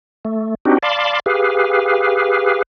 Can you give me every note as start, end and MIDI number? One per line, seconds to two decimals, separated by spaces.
0.25 0.55 57
0.65 0.78 60
0.65 0.78 62
0.65 0.78 63
0.65 0.78 66
0.65 0.78 67
0.83 1.20 74
0.83 1.20 77
0.83 1.20 81
0.83 1.20 83
0.83 1.20 84
0.83 1.20 86
1.26 2.62 67
1.26 2.62 68
1.26 2.62 71
1.26 2.62 77